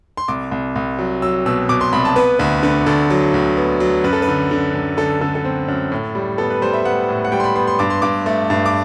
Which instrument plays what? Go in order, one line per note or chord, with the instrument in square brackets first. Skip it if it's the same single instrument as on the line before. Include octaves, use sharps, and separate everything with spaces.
[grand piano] C6
C2 D6
C2
C2
F#3
F#3 E6
B2 E6
B2 D6
C6
C2 B5
A5
B3 B4
D2 B4
D3 B4
D2 A4
F#3
D2
B3
F#3
F#2 B4
A4
B4
D3
D3
F#2
D3 A4
D3 A4
A4
C4
F#2
A2
G3
B3 A4
B4
G3 C5
E5
B3 F#5
A2
F#5
G3 G5
C6
B5
B3 C6
C6
G2 D6
C6
G2 D6
A3
G2
D6